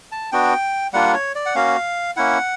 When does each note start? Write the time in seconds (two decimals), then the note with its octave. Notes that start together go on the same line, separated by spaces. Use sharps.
0.12 A5
0.32 B3 D4 F#4 G5
0.93 G3 A#3 D4 F4 F#5
1.14 C#5
1.35 D5
1.46 F#5
1.55 A#3 C#4 F#4 F5
2.16 A#3 C#4 E4 F#5